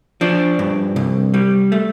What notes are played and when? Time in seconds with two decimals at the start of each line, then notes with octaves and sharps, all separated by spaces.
0.21 F3 D4
0.59 G2
0.96 C2
1.34 G3
1.72 A3